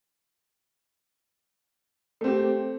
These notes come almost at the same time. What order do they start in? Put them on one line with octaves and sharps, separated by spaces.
A3 C4 G4